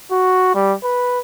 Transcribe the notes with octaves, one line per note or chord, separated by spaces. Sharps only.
F#4
G3
B4